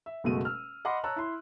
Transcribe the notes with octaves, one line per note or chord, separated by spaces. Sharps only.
E5
F#1 B2 G#3 A3 F#4 D#7
E6 F6
D#5 F#5 B5 C6 D6
C#5 A5 A#5 E6 F#6
E4 C6